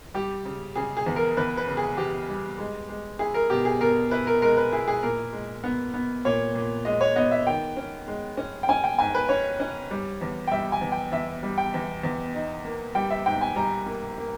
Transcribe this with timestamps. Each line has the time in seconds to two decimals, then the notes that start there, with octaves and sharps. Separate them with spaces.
0.14 G3 G4
0.45 C#3
0.76 C#3 G#4
0.97 G#4
1.06 E2
1.16 A#4
1.37 E2 B4
1.57 B4
1.67 C#3
1.77 G#4
1.97 E2 G4
2.29 G3
2.59 G#3
2.89 G#3
3.19 E4 G#4
3.34 A#4
3.50 B2 G4
3.65 G#4
3.81 B2 A#4
4.11 E4 B4
4.27 A#4
4.42 G#3 A#4
4.57 B4
4.72 E4 G#4
4.88 G#4
5.03 A#2 A#4
5.33 G#3
5.64 B3
5.94 B3
6.25 A#2 C#5
6.55 A#2
6.85 G#3 D#5
7.01 C#5
7.16 B3 D#5
7.31 E5
7.47 D#3 G5
7.77 C#4
8.08 G#3
8.37 C#4
8.63 G5
8.69 C#4 G#5
8.84 G5
8.99 G#2 G#5
9.15 B4
9.29 C#4 C#5
9.60 C#4
9.91 G3
10.21 E2
10.47 G5
10.52 G3 E5
10.72 G#5
10.81 E2
10.92 G5
11.12 E2 E5
11.43 G3
11.58 G5
11.74 E2
12.03 E2
12.34 D#4
12.65 A#3
12.95 G3 G5
13.11 E5
13.26 G#2 G5
13.41 G#5
13.56 G3 A#5
13.86 A#3
14.18 A#3